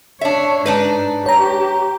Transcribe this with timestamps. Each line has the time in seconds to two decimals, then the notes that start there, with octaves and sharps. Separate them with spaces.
0.21 D4 C#5 E5
0.66 G#2 D4 D#4 B4
1.26 G4 C#5 A#5